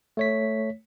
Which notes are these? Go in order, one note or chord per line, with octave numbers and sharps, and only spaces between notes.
A3 C#5 B6